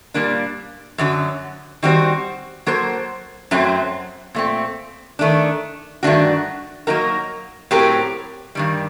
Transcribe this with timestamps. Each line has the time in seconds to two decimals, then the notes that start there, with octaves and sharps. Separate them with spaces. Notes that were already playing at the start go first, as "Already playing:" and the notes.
0.14 A#2 G3 A#3 D4
0.98 F#2 D3 F#3
1.83 D#3 G3 C4 F#4 C5
2.66 F#3 A#3 F#4 A4 C5
3.51 F#2 F#3 A3 C4
4.35 A#2 A3 C4
5.19 D#3 A3 D4
6.03 G2 D#3 A3 D4 F#4
6.87 F#3 A#3 D#4 F#4 A#4
7.71 A2 F#3 C4 G4 A#4
8.55 G2 D#3 G3